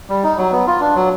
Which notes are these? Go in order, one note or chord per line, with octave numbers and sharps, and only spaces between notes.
G3
D#4
F#3
B3
F4
D4
F#3